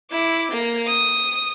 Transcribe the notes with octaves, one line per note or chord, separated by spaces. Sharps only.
E4 D6
A#3
D#6